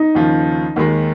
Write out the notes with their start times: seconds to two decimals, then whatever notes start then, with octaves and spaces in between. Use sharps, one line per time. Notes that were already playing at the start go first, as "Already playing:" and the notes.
Already playing: D#4
0.15 D#2 C#3 F3
0.76 D#2 D#3 G#3